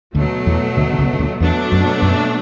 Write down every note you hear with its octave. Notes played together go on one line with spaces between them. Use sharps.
D2 B2 D3 F#3 A3
E2 E3
D2 D3
D3
C#2 C#3
C#3
D2 D3
E2 B2 F#3 A3 D4
F#2
F#2